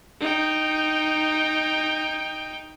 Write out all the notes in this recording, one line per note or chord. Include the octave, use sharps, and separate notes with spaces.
D#4 G5